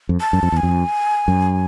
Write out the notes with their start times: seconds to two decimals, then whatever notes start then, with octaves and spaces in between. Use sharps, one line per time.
0.09 F2
0.21 A5
0.33 F#2
0.43 F2
0.52 E2 G#5
0.63 F2
1.28 F#2